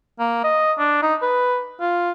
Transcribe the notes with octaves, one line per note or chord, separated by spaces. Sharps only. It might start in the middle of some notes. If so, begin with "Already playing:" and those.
A#3
D#5
D4
D#4
B4
F4